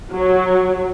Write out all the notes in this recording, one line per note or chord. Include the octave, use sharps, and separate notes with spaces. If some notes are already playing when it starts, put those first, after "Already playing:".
F#3